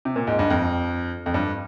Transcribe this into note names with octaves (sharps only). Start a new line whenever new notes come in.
C3
A#2
G#2
G2
F2
F2
G2